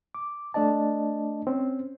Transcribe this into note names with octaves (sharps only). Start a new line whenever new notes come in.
D6
A3 D4 D5 D#5 A5
C4 C#4